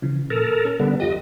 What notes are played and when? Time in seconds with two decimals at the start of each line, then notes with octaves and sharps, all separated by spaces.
0.02 C#3 E3 F3
0.30 A#2 A4 A#4
0.65 C#4
0.80 D3 G3 B3
1.00 F2 F4 G4 D#5